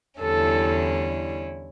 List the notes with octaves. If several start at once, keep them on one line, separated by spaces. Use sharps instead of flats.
E2 D3 G3 C#4 E4 A4